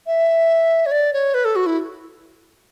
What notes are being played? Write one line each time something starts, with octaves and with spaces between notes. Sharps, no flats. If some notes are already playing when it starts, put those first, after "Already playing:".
E5
C#5
D5
C#5
B4
A4
F#4
E4